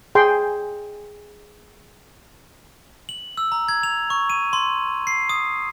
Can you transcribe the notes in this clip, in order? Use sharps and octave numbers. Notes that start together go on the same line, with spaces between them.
G#4 G5 C6
F#7
E6
A#5
G#6
F7
C#6
D#7
C6
C7
D#6